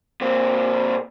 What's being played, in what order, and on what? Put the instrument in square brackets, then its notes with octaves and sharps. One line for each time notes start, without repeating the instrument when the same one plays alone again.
[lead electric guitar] A#2 C4